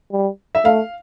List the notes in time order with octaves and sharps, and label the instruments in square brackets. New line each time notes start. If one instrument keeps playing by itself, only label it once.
[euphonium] G3
[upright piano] E5
[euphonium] A3 [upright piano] F5